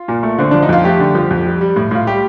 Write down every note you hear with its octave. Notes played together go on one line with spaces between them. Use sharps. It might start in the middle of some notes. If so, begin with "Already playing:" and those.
Already playing: F4
A#2
A3
D3 C4
F3 D4
D#4
F2 F4
A3 G4
D3
F3
F2
G3
G3
A2
A2 F4
G3 G4